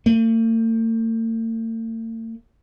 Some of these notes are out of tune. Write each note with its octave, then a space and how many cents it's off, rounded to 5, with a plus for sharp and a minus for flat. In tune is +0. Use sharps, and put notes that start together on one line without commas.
A3 +45